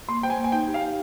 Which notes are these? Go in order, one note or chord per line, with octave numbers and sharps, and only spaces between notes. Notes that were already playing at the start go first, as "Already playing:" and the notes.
A#3 C6
C5 G5
G#5
A#3
G#5
D#4 G5
G4
F5
G4